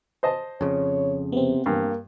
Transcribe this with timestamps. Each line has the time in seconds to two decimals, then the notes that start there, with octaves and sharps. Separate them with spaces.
0.23 C5 D#5 A5
0.61 F2 C#3 C#5
1.32 C3 B3 C4
1.66 G2 A#3